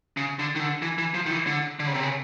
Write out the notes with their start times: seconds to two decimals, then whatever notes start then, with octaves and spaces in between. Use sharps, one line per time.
0.17 C#3
0.39 D3
0.56 D#3
0.60 D3
0.82 E3
0.98 E3
1.14 F3
1.26 D#3
1.31 E3
1.47 D3
1.79 D3
1.87 C#3
1.94 C3
2.02 C#3